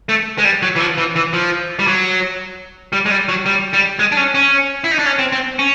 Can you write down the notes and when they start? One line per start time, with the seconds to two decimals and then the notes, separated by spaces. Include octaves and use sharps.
0.09 A3
0.38 G#3
0.45 G3
0.62 F#3
0.76 E3
0.80 F3
0.98 E3
1.16 E3
1.33 F3
1.79 G3
1.87 F#3
2.93 G3
3.06 G#3
3.11 G3
3.29 F#3
3.46 G3
3.73 G3
3.99 G#3
4.12 D4
4.17 C#4
4.35 C#4
4.84 E4
4.91 D#4
4.99 D4
5.06 C#4
5.19 C4
5.32 C4
5.59 C#4